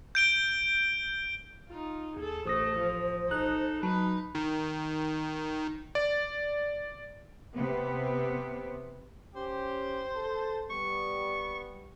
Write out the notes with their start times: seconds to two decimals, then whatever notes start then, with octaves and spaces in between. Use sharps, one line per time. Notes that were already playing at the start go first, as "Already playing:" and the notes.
0.15 G6 D7 G7
1.70 D#4 F4
2.17 D#2 G#4 A4
2.46 A1 A3 A4 C5 D#6 A#6
2.79 F3
3.29 B1 D#4 A4 F#6
3.83 F#3 D#4 B4 A5
4.35 D#3
5.95 D5
7.54 C3 B3
9.36 C#4 G4 C5
10.16 A4 A5
10.70 G3 B3 C#6